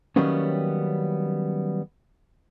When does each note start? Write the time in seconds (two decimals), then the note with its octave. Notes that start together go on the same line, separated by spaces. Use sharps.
0.16 D#3 F#3 G3 A#3 B3 C#4